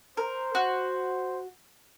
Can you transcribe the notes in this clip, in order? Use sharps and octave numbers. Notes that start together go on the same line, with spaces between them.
A#4 C5
F#4